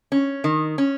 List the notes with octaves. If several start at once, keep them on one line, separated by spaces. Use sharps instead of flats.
C#4
D#3
C#4